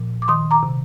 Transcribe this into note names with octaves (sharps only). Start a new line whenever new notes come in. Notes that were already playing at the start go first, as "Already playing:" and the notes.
Already playing: A#2 F3
D6
D#3 C6 D#6
A#5 D6
C3